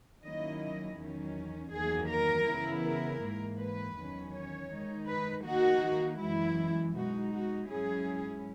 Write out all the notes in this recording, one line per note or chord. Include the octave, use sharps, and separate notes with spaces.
D#3 F#3 A#3 C#4 E4 D#5
E2 D#3 F#3 C#4
E2 D#3 F#3 A#3 G#4
A#4
C#3 E3 B3 E4
A#4
G#2 E3 A#3
B4
E2 D#3 F#3 C#4
C#5
D#3 G#3 D#4
B4
D#3 A#3 D#4 F#4
F#2 E3 G#3 E4
B2 G#3 D#4 F#4
F#4
G#2 F#3 C#4 E4 G#4